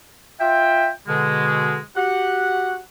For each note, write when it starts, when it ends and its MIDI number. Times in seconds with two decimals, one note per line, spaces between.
0.41 0.91 65
0.41 0.91 76
0.41 0.91 79
1.08 1.80 47
1.08 1.80 50
1.08 1.80 56
1.97 2.79 66
1.97 2.79 67
1.97 2.79 78